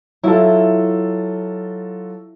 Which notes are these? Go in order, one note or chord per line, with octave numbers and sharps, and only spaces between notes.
F#3 E4 F4 A4